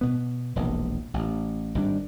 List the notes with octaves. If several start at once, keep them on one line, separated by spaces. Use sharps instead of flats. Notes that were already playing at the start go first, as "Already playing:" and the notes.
B2 B3
E1 A#1 D#2
A1
G#1 G3 D4